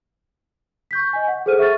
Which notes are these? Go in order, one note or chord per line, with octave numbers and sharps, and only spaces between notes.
C#6 G6 B6
D#5 G#5
F#5
G#4 A4 C5 F6 D#7
E5 C#6 F6 A6